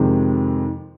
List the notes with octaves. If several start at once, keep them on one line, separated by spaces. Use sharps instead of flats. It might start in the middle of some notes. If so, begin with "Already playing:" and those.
Already playing: F2 C3 D#3 G#3